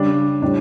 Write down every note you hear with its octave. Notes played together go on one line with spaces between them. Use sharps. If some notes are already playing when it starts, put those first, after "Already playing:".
Already playing: C#3 G3 D4
A2 G3 D4